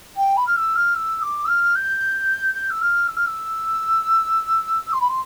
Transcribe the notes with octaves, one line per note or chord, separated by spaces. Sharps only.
G5
B5
F6
E6
F6
E6
D6
E6
F6
G6
G6
E6
F6
E6
F6
E6
C6
B5
C6